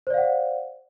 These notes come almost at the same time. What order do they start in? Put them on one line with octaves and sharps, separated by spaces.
C5 D5 F5 F#5